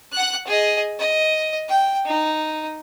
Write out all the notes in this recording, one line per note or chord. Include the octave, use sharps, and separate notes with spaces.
F#5 F#6
G#4 D#5
D#5
G5
D#4